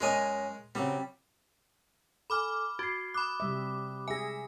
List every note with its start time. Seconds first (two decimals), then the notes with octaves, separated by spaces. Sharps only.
0.01 F#2 G#3 A#4 C#5 D#5 G#5
0.75 C#3 F#3 G3 C4
2.30 A4 G#5 B5 D6 F6
2.79 F#4 G#6 C7
3.14 B5 D6 D#6 F#6
3.40 C3 G3 E5
4.08 G#4 E5 G#5 A#6